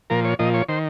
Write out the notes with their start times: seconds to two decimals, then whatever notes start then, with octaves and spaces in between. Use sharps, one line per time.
0.10 A#2 F3 A#4
0.25 C#5
0.39 A#2 F3 D#5
0.54 C#5
0.69 D#3 C5